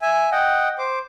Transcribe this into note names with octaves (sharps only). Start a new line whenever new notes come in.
E5 G#5
D#5 F#5 G5
C5 D6